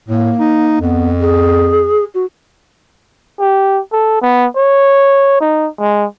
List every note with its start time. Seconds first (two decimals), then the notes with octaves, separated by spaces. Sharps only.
0.08 A2 A#3
0.39 D#4
0.81 F2 B3
1.20 G#4
2.14 F#4
3.40 G4
3.93 A4
4.22 B3
4.56 C#5
5.40 D#4
5.80 G#3